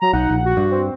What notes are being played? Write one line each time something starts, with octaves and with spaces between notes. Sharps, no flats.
F#3 A#5
B1 D#4 F#5
A#1
F#4
G2
C4